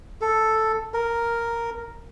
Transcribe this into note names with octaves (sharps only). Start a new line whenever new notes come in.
A4
A#4